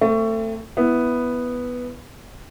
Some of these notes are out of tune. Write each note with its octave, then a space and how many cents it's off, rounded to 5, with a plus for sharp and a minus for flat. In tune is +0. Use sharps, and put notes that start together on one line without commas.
A3 +25 C4 +0
B3 +0 E4 +0